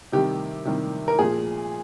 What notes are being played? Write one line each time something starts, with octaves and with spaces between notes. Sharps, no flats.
C3 D#3 G3 G4
C3 D#3 G3
A#4
A#2 F3 G#4